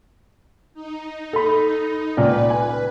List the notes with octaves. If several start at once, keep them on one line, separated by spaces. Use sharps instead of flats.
D#4
A4 B5
C#2 A#2 B4 D5
G#5